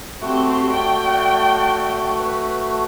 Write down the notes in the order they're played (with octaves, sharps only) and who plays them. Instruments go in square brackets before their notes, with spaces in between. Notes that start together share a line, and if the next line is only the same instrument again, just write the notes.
[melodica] A3 F#4 [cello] C4 G4
[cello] D5 G5
B4